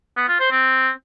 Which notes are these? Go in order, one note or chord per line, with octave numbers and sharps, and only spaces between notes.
B3
F4
C5
C4